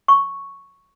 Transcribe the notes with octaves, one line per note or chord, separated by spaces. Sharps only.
C#6